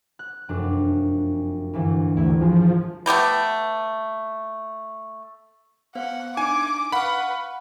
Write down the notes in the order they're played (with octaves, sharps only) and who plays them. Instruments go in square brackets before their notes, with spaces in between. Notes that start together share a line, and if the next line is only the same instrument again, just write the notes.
[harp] F#6
F1 F#2 D4
D2 G2 E3
[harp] G#1 E4 [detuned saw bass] D2
[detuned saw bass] F3 [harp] G#3
[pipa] A3 B3 G4 B4
[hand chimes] B3 C5 F5 [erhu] F#5
[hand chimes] D4 D#4 [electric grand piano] G#5 [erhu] D6
[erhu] B4 [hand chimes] F5 C#6 F6 [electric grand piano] F#5 B5